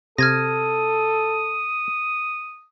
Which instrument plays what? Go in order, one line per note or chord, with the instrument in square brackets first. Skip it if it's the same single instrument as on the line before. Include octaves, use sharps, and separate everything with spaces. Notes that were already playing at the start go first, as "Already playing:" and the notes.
[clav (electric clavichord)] C3 [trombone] A4 [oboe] D#6 [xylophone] F6 G#6 A#6